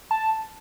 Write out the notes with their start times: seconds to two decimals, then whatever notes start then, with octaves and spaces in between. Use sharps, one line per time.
0.11 A5